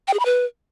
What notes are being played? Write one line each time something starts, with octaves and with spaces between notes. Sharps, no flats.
G5
G#4
B5
B4